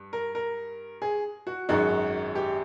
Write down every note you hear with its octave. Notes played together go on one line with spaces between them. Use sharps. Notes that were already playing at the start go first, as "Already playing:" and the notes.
Already playing: G2
A#4
A#4
G#4
F#4
G#1 F#2 D#3 G#3 F#4
G4